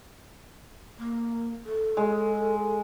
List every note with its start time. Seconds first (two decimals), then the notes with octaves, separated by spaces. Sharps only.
0.99 A#3
1.65 A4
1.97 G#3